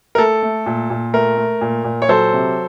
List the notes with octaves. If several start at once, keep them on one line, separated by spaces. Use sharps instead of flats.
A#4
A3 A4
A3
A#2
A#2
A3 A#4
A3
A#2
A#2
C#5
F#3 A4 C5
C3